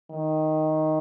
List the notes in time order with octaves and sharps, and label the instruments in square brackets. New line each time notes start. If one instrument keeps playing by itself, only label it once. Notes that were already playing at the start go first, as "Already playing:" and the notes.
[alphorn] D#3